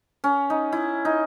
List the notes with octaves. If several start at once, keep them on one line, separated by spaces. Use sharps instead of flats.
C#4
D#4
E4
D#4